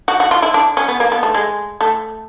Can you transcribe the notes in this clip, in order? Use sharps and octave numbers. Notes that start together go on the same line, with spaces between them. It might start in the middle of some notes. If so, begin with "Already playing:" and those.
F#4
F#4
F4
E4
D4
C#4
B3
A#3
B3
A3
G#3
A3